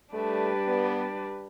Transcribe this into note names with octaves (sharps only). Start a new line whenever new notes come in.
G3 A3 D4 G4 B4 D5
B3